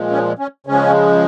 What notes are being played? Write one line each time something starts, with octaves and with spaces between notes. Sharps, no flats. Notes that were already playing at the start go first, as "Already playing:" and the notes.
Already playing: A#2 F3 G#3
C#4
C#4
C#3 F3 G#3 C#4